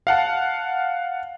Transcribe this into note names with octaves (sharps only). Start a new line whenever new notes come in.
F5 F#5 A5